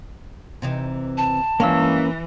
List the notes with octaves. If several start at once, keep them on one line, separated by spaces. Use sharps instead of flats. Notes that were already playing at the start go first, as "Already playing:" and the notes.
C3 E3 D#4
A5
G2 E3 G#3 A#3 C#4 F5 E6